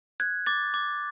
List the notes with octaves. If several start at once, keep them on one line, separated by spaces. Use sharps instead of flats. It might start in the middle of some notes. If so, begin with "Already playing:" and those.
F#6 G#6
D6 A6
D6